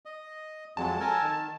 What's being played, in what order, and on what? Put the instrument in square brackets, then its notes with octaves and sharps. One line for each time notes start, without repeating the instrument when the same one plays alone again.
[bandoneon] D#5
[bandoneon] F2 F#3 G#3 [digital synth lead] A5
[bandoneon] A4 A#4 G#5
D#3